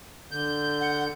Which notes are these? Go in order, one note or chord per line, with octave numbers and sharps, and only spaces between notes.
D3 G6
F#5